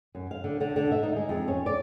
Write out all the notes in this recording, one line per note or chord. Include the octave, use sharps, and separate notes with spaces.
F#2
F5
D3
D3
D3
E5
D#4
G#3
F2
C#4
D5